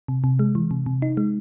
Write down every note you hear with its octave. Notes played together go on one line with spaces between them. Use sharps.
C3
C3
G#3
E3
C3
C3
D#4
G#3